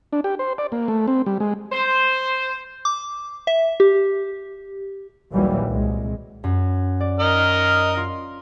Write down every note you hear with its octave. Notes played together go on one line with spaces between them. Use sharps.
D4
G4
C5
D5
A#3
A3
C4
G3
G#3
C5
D6
E5
G4
A#1 D#2 A#2 E3 F#3 G3
C2 G#3
F#2
D5
A#4 D#5 F6
F4